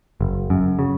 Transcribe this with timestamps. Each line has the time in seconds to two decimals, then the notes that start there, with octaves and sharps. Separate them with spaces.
0.21 F#1
0.50 F#2
0.79 C#3